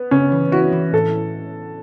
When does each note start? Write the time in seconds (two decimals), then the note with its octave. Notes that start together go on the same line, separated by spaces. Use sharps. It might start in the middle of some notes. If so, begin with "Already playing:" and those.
Already playing: B3
0.11 C#3 C#4
0.32 E3
0.52 E4 F#4
0.73 E3
0.93 A2 A4